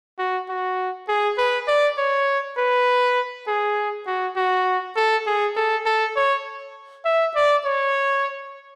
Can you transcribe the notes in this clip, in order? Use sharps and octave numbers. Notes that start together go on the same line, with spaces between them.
F#4
F#4
G#4
B4
D5
C#5
B4
G#4
F#4
F#4
A4
G#4
A4
A4
C#5
E5
D5
C#5